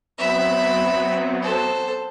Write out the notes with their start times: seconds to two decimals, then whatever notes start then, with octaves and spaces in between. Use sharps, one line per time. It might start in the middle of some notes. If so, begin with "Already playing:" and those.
0.18 F#3 B3 C4 E5 B5
1.43 A4 C5